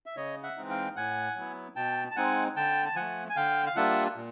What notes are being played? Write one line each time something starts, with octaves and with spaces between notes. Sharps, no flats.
E5
C#3 C#5 D#5
E5 F#5
E3 G#3 C4 D#4
F5 G5
A2 F#5 G#5
F#3 B3 E4
B2 G5 A5
A5
G#3 C4 D#4 F#5 G#5
D3 G5 A5
A5
F3 A3 F#5 G#5
G#5
D3 F5 G5
F5
G3 A#3 D4 F4 E5 F#5
A#2